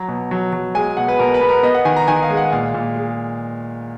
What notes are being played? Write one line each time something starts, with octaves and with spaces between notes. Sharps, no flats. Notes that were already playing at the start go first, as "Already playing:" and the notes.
Already playing: F#3 A#5
B2
F#3
F#3
G#3 G#5
B2 F#5
B4
B2 A#4
B4
B3
A#4
B3 D#5
F#5
D#3 G#5
A#5
D#3 G#5
F5
G#3
F#5
A#2 F5
A#2
G#3